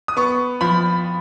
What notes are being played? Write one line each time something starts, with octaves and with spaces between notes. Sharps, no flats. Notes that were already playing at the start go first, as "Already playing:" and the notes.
D#6
B3 C#6
F3 B5